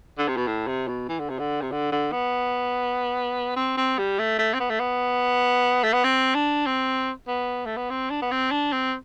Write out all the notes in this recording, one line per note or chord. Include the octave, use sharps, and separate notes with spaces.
D3
C3
B2
A2
C3
B2
E3
D3
C3
D3
C3
D3
D3
B3
C4
C4
G3
A3
A3
C4
B3
A3
B3
A3
B3
C4
D4
C4
B3
A3
B3
C4
D4
B3
C4
D4
C4